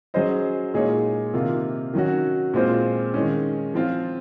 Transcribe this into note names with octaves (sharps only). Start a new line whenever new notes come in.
F#3 C#4 G#4 C5 D#5
A#2 G#3 D#4 G#4 C#5
C3 D#3 A#3 F4
D#3 F#3 C#4 F#4
A#2 G#3 C4 F4 C5
D#3 G#3 C#4
F3 C4 F4